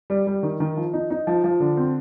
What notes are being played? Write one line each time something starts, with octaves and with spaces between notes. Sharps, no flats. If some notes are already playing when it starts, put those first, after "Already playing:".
G3
G3
D#3
D#3
F3
D#4
D#4
F3
F3
D3
C4